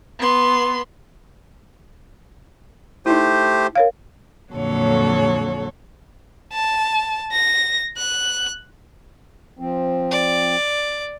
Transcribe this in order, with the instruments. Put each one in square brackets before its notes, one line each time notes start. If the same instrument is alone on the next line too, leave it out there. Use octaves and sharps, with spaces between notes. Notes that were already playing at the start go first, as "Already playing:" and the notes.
[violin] B3 C6
[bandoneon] A3 G4 C5 [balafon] D#4 E4
[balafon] A#4 C#5 F5
[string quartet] F2 A#2 D3 F#3 A4 C#5
[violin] A5
A#6
F#6
[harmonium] F3 C4
[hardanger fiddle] D5